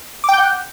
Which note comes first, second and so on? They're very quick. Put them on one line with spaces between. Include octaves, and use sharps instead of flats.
D6 G5 G6 F#5